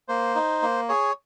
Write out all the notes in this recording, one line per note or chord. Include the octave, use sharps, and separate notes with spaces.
A#3 C5
D#4
A#3
G#4 C#5